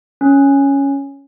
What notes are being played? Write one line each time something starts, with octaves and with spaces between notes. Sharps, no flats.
C#4